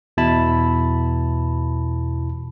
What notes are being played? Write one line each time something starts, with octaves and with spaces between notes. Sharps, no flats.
E2 B2 E4 A5 B5